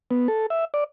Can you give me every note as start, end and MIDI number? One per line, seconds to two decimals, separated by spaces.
0.11 0.28 59
0.28 0.46 69
0.50 0.65 76
0.74 0.84 74